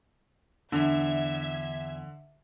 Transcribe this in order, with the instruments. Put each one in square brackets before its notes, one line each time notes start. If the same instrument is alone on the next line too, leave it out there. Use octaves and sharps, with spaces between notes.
[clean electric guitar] E2 [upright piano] D3 [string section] E5 G#6